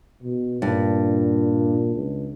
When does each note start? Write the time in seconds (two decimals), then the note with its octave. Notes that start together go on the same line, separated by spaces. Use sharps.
0.23 B2
0.62 G2 A#2
1.95 C#2